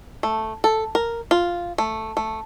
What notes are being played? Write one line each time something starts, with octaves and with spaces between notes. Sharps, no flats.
A3
A4
A#4
F4
A3
A3